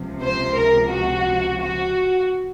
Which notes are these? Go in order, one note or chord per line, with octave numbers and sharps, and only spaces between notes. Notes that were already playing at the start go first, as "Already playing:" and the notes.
Already playing: C#2 C3 F3
C5
A#4
F#4
F#4